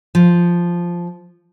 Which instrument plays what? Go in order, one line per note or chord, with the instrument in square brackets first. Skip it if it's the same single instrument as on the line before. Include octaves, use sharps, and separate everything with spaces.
[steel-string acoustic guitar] F3